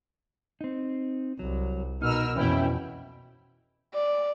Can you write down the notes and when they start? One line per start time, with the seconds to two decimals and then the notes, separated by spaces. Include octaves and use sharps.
0.61 C4 D#4
1.39 C2 F#3
2.02 B2 D#4 A#4 E6 F6
2.35 F2 B2 E3 C#4 E4 G5
3.94 D5